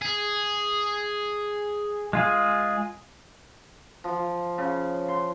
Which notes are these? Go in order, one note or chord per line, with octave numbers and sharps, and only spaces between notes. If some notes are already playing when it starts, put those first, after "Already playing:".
G#4
G#3 F4 G#4
F3
C#3
C6